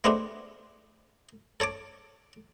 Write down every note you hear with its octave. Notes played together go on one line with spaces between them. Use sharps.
G#3 A3 B3 C4 D4 G4
A4 C#5 A5 D6